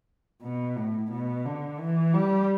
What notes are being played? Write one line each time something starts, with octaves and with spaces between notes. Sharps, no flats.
B2
A2
B2
D3
E3
G3